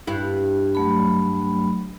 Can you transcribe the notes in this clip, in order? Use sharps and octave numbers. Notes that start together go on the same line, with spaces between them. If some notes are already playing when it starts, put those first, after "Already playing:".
G2 E4
F#3 A3 B5